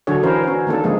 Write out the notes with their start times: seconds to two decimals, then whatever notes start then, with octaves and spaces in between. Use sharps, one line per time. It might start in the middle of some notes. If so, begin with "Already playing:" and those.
0.07 D3 F#3 D4 F#4 A4 C#5
0.23 E3 C#4 E4 A#4 C5
0.44 C#4 F#4
0.67 D#3 A#3 D4 A4
0.84 C#3 F3 G#3 G#4